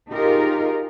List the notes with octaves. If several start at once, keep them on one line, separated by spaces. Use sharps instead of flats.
D#4 F4 G4 G#4 A#4